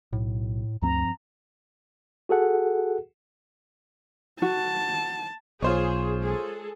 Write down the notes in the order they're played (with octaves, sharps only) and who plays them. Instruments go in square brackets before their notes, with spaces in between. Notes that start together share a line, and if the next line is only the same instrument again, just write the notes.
[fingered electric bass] B1 [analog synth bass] A2
[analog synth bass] D2 [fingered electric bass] G2 F3 C4 [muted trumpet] A#5
[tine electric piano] F#4 G#4 A4 F#5
[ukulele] F#4 [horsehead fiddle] A5
[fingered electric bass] B1 [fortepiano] F4 C5 C#5 [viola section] G#4
[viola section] G#3 G#4 A4